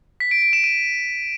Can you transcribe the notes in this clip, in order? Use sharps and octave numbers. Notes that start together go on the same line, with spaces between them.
B6
D7
D7
E7
D#7